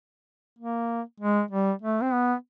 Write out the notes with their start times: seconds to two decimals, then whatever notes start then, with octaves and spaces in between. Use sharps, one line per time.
0.59 A#3
1.20 G#3
1.51 G3
1.82 A3
2.02 C4
2.13 B3